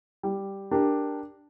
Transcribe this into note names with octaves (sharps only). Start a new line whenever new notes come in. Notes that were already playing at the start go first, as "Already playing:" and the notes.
G3
D4 G4 A#4